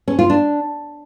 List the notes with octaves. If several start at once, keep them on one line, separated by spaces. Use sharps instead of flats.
C#4
F4
D4